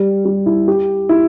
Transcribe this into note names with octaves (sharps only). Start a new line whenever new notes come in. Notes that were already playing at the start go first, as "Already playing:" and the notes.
Already playing: G3
G3
E4
G4
E4